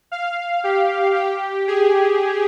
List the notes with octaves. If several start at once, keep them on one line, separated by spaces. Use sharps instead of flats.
F5
G4
G4
G#4